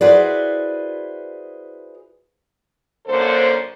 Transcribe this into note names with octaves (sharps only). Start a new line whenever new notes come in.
E4 F#4 G#4 B4 C5 D5
F#2 D3 A#3 A4 C5